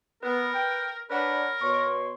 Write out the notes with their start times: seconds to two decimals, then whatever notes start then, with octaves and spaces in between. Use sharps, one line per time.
0.23 B3 A#4 B4
0.54 G5
1.10 D4 A#4 B4 C#5 F#5 B5
1.61 B2 C#5 C6 C#6